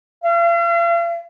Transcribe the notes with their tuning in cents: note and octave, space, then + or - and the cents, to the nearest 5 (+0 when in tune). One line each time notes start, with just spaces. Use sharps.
F5 -45